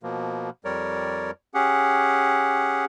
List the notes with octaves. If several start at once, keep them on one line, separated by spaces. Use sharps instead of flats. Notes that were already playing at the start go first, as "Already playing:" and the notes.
B2 F3 A#3
F2 G3 A#4 C#5 D5
C#4 G4 G#4 F#5